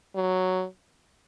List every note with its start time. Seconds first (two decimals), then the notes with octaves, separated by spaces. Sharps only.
0.16 F#3